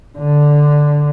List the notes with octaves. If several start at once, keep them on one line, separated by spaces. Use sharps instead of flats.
D3